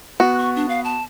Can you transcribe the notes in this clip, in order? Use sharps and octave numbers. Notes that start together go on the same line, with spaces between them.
B3 F#4 F#6
C#6
D4
F5
A5